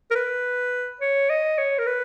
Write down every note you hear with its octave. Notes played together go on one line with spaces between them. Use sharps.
A#4
B4
C#5
D#5
C#5
A#4
B4